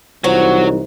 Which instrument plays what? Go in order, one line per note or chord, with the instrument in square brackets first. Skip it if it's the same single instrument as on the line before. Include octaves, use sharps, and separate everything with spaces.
[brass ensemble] C2 E3 D#4 [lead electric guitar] F#3 [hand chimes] F4 C5 C#5 [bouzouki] F#4